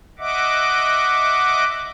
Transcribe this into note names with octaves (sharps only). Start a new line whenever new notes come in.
D#5 E5 F#5 D6